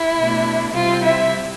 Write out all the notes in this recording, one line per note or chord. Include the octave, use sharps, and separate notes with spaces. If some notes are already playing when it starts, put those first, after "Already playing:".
Already playing: E4
B2 A3 D4
C3 G3 C4 F4
E4 E5